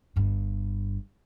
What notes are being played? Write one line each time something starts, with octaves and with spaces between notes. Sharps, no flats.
G1 G2